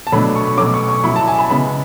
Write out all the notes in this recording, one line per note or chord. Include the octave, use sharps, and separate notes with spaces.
A5
B2 F#3 A3 D4 B5
C#6
B2 F#3 A3 C#4 D6
C#6
C#6
F#3 C#4 E4 B5
A5
G#5
B5
C#3 G#3 B3 B5